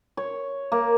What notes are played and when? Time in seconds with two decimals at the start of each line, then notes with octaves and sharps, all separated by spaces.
0.17 C#5
0.72 A#3